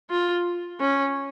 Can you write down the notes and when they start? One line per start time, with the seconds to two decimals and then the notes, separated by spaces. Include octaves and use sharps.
0.10 F4
0.80 C#4